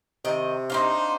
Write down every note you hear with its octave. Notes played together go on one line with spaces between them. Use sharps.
C3 D#3 D#5
C4 D4 D#4 F#4 C5 F5